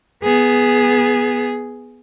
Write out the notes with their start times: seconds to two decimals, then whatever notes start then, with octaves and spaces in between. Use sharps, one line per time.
0.23 B3 G#4